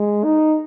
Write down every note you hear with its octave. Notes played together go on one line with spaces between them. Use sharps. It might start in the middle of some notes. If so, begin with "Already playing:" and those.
Already playing: G#3
D#4